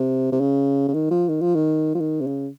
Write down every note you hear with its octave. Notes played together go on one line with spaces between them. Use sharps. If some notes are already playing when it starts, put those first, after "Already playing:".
Already playing: C3
C3
C#3
C#3
D#3
F3
D#3
F3
D#3
F3
D#3
C3
C#3